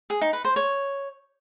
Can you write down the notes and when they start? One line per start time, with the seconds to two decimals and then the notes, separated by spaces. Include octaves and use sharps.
0.10 G#4
0.21 D#4
0.33 B4
0.44 C5
0.56 C#5